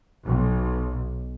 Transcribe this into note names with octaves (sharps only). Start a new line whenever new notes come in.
B1